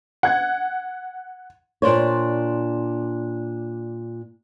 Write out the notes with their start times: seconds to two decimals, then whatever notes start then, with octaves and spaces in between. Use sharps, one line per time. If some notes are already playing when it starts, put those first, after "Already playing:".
0.23 F#5 G#6
1.82 A#2 D4 C5 C#5